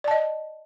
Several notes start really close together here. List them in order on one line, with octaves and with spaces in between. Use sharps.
D5 A5 D#5